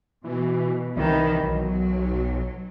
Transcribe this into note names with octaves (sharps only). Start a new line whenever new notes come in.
B2 E3
C2 D#3 E3 D#4
B1 F#3